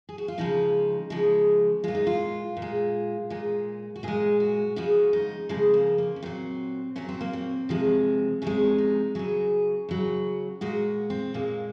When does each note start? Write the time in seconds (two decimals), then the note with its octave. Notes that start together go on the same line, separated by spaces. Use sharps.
0.09 G#4
0.18 F#4
0.28 F4
0.38 C#3 F3 G#3 D#4
1.10 C#3 F3 G#3
1.84 A#2 G#3 F4
1.95 D#4
2.07 F4
2.57 A#2
2.62 G#3
3.30 A#2 G#3
3.96 F#4
4.03 A#2 G#3 G#4
4.40 F#4
4.76 C#3 F3 G#3 F#4
5.13 D#4
5.49 C#3 F3 G#3 C4
5.74 A#3
5.98 A#3
6.16 C#4
6.22 A#2 F#3 C4
6.96 A#2 F#3 C#4
7.09 C4
7.21 A#3
7.33 C4
7.69 C3 F3 G#3
8.42 C3 F3 G#3 C#4
8.78 D#4
9.15 C#3 F#3 G#4
9.89 C#3 F#3
10.61 A#2 G#3 F#4
11.10 C4
11.34 A#2 G#3 A#3